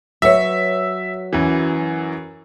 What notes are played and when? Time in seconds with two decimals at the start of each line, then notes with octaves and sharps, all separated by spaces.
0.22 F#3 B4 C#5 E5
1.33 F#2 E3